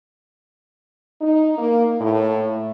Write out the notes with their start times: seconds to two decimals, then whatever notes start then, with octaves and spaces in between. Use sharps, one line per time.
1.21 D#4
1.58 A#3
1.99 A2